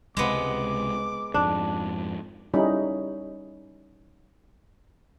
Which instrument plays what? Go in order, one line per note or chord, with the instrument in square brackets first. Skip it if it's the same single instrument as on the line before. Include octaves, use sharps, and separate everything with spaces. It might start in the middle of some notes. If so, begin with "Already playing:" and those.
[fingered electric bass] C#2 C3 [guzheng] G#3 B3 [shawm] D6
[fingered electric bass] F2 G#2 [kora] D4
[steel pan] G3 C#4 D#4 E4 B5